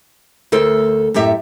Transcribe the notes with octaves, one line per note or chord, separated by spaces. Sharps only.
D2 A4 A#4 C5
F#2 A2 G4 E5